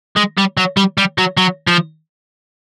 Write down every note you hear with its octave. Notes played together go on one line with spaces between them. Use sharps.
G#3
G3
F#3
G3
G3
F#3
F#3
F3